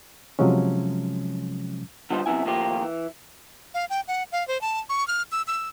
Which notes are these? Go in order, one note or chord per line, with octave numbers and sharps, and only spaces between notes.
C3 F3 F#3 G#3 C#4
D3 G3 D#4 F4 B4 C5
F#2 C3 A3 B3 E4 G#5
A2 D#3 F3 A#3 F4 G4
E3
F5
G5
F#5
F5
C5
A5
C#6
F6
E6
E6